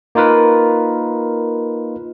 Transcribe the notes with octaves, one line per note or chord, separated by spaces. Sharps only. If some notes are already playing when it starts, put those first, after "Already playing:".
A#3 D#4 F4 A#4 B4